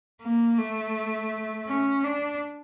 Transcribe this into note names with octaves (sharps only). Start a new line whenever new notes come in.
A#3
A3
C#4
D4